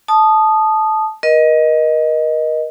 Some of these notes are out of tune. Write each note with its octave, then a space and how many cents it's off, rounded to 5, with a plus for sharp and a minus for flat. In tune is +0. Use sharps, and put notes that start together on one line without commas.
A5 -15 D#6 -10
A#4 +35 D#5 +0